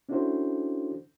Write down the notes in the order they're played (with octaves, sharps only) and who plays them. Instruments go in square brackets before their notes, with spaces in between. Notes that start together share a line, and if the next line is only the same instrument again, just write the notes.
[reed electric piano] C#4 D4 E4 F#4 A4 C5